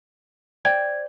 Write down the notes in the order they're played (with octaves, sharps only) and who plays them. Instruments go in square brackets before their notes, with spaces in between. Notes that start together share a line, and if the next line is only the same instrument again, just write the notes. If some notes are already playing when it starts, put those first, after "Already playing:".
[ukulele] C5 D5 G5 [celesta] G#6